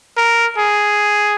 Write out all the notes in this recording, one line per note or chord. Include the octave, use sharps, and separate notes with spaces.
A#4
G#4